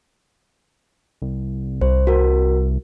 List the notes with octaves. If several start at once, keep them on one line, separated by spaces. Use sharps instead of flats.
C2
C2 C5
F#4 A#4